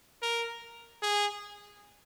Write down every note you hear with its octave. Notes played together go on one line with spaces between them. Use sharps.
A#4
G#4